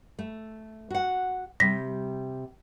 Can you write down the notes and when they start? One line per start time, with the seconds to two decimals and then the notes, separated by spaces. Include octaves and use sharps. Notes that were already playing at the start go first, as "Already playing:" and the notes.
0.19 A3
0.91 F#4 F#5
1.60 C3 G3 A#6 B6